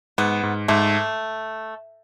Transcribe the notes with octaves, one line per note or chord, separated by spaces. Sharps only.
G#2 B3
G#2
G#2 A3